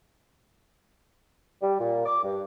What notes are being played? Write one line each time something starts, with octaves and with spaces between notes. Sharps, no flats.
G3
A#2
D6
G2